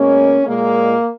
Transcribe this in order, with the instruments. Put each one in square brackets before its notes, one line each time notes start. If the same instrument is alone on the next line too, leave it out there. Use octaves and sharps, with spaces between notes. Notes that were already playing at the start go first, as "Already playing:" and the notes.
Already playing: [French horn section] B2 G#3 A#3 C#4
A#2 G#3 A#3